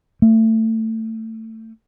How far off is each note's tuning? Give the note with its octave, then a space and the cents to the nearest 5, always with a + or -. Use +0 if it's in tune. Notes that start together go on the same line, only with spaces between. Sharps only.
A3 +20